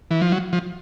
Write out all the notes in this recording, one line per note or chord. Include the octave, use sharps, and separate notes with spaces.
E3
F3
F#3
F3